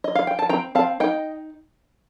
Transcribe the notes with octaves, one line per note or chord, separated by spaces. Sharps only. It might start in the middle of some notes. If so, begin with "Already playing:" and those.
D#5
F5
G5
A5
C4 G5 A#5
C4 F5 A5
D#4 D#5 G5